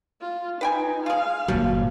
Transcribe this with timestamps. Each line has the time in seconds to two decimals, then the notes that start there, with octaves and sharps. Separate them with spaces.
0.21 F4
0.61 D#4 B4 G5 G#5
1.06 F4 G#4 F5
1.48 G1 A#2 F3 F#3